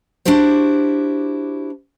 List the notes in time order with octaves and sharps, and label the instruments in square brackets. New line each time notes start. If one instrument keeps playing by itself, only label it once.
[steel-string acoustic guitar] D4 E4 F#4 G4 C5